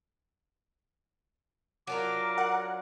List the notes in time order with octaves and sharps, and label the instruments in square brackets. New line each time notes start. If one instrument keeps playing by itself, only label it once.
[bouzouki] F#3 D4 F4 [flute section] A#4 [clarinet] D6
[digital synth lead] F#5